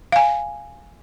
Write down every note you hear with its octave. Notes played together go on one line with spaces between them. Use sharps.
F5 G#5